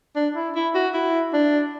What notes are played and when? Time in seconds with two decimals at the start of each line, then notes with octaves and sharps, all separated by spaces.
0.16 D4
0.35 E4
0.55 E4
0.75 F#4
0.93 E4
1.33 D4